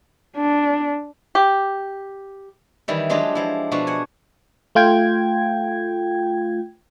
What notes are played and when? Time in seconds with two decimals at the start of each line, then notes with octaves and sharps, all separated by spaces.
0.37 D4
1.35 G4
2.88 D#3 E3 G3 E4
3.10 F#3 G#3 D4 F4 G4 D#5
3.35 F3 E4
3.71 B2 F3 D4 F#4
3.87 F#5 G#5
4.75 A3 F4 G5 G#6